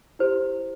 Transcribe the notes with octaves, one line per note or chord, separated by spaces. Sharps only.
E4 G4 C5